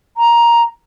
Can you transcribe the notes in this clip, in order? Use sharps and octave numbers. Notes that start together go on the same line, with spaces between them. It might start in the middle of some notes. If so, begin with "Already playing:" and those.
A#5